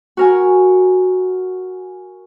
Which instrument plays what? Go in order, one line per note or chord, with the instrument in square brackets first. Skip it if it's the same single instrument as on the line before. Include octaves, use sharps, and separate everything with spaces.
[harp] F#4 A#4 G#5